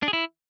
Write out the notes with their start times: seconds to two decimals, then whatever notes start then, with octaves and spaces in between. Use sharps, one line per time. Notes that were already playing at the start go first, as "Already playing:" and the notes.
0.03 D4
0.08 G#4
0.13 E4